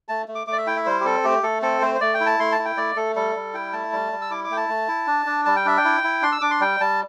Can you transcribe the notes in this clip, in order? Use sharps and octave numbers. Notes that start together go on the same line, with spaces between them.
A3 A5
A3
D6
A3 D6
D5
E5
E4 G5
E5
G3 C5
G4
C4 A4
A3 G4
A3 A4
C4 A4
A3 C5
C5
A3 D5
G5
E4
A5
A3 C6
A5
E4
G5
A3 D5
A3 A4
G3 A4
G3
E4 G5
A3 A5
G3
G3
E6
E4 D6
D6
A3 G5
A5
A3
E4
D4
D4
G3 A5
G5
D4 E5
G5
E4
E4
D4 C6
E6
D4 D6
C6
G3 G5
G3 A5